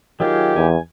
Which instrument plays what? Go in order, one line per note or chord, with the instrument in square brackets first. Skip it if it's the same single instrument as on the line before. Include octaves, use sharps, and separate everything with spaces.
[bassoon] D#3 [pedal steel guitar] F#3 F4 G#4 [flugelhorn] G4
[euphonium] E2 [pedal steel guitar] G#5